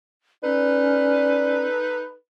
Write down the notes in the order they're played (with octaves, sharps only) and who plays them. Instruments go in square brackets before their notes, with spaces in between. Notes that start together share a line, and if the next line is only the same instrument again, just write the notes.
[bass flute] C#4 [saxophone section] D#4 A4 B4 [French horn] D5